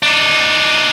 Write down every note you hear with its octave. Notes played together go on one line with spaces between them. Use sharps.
D4 D#4